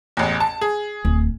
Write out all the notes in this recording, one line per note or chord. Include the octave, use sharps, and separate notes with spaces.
A1 E2
A5
G#4
D1